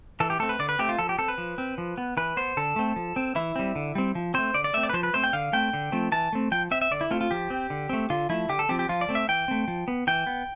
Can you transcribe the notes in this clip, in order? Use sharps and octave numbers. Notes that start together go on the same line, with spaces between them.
E3 A4
G4
A3 C4 A4
B4
D3 D5
B4
A3 C4 G4
F4
F3 A4
G4
C4 A4
B4
F3
C4
F3
B3
E3 B4
B3 C5
D3 A4
A3 C4
F3
C4
E3 E4
G3 C4
D3
G3 C4
F3
A3 C4 C5
D3 D5
D5
A3 C4 E5
D5
B4
F3 C5
B4
A3 C4 C5
G5
D3 F5
A3 C4 G5
D3
F3 A3 C4
E3 A5
A3 C4
F3 G5
C4 E5
E5
D3 D5
E4
A3 C4 F4
F4
F3 G4
C4
D3
A3 C4
D3 F4
F3 A3 E4
D3 G4
A4
F3 C4 G4
G4
F3 F4
D5
A3 C4
E5
E3 G5
A3 C4
F3
B3
E3 G5
B3